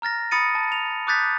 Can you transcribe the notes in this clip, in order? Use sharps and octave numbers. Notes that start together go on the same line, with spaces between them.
A#5 F6 A6 A#6
B5 D#6 A6 C#7 D#7
A5
F7
D6 D#6 F#6 G6 A6 B6